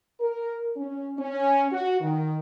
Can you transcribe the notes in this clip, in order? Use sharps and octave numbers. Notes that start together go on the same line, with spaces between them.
A#4
C#4
C#4
F#4
D#3